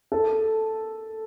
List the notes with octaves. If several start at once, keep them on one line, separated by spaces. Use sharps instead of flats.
A4